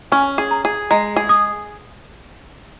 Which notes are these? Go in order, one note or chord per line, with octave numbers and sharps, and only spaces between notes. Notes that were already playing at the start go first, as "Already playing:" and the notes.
C#4 G#5
G#4
A#5
G#4
G#3 A#5
G#4
D#6